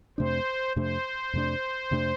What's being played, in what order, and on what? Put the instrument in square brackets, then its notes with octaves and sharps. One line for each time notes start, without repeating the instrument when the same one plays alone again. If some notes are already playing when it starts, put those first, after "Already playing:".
[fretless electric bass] F2 C3 A3 D4 [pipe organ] C5
[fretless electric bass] F2 C3 A3 D4 [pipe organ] C5
[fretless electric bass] F2 C3 A3 D4
F2 C3 A3 D4